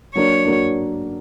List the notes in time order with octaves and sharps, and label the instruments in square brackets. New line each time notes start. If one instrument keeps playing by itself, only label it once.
[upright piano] F#3 A#3 D4 [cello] C#5
[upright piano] F#3 A#3 D4